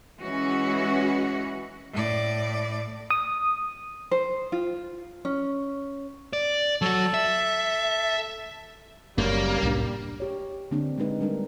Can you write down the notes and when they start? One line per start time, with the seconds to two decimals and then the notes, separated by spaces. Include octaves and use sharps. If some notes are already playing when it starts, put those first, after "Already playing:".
0.20 E3 G#3 C#4 F#4 C#5
1.93 A2 D5
3.10 D#6
4.11 C5
4.52 F4
5.25 C#4
6.33 D5
6.81 F#3 F#4 A4 A5
7.14 E5
9.18 F#1 F#2 G3 A#3
9.63 C2 A2 D4
10.20 G4 C#5
10.71 D3 A#3 C4 D4
10.98 G#3 A#3 D#4 B4
11.21 G3 D4 A#4